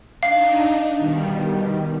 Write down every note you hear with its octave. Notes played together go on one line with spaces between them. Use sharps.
D4 D#4 F5
B2 D#3 G3